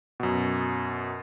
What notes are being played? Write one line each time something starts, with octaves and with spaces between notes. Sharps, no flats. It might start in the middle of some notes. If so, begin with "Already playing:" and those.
F#2 B2